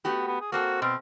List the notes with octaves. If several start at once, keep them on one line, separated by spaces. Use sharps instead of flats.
A3 B3 F#4 G4
B3
G#4
A#3 C4 F#4 A4
B2 C4